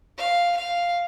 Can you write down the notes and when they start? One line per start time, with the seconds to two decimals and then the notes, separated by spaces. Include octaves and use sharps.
0.18 F5
0.57 F5